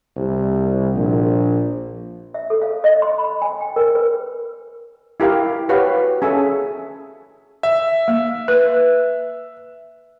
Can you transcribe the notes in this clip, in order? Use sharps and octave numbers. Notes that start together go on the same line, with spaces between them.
C2
A#1
E5
A4
F5
D#5
C6
B5
G#5
G5
A#4
B4
E4 G4 A#4 F5
F#4 G4 B4 C#5 F5
C#4 G#4 A4 E5 G#5
E5
A#3
B4